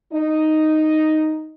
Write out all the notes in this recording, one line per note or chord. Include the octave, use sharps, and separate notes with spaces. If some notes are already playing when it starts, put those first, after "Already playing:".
D#4